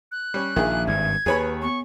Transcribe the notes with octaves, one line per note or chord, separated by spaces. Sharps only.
F#6
G3 C#4
A#1 D#3 G#4 E5
G#1 G2 G#6
D#2 G#4 B4 C#5 B5
B3 C#6